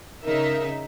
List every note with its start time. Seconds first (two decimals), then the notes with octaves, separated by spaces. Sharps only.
0.24 C#3 D#4 A#4 E5